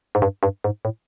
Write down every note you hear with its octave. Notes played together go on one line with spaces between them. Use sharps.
G#2
G2
G2
G#2
A2